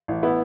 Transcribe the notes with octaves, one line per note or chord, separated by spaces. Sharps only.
A1
B3 E4